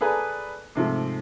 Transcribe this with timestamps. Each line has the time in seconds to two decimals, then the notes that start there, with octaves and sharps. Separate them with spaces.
0.01 G#4 A4 B4 D5 G#5 A#5
0.75 G#2 C3 F3 A3